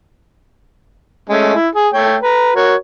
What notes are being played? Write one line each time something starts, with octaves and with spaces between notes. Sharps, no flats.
G#3 A3 C#4
E4
G#4
A3 C#5 G5
B4 A#5
F#4 A#4 C#5